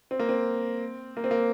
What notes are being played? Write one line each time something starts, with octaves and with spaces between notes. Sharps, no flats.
C4
A#3
C4
A#3
C4
A#3